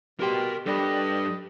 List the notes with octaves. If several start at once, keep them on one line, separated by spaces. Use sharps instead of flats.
B2 G3 G4 A#4 G5 C6
G2 G4 A4 D5 D#5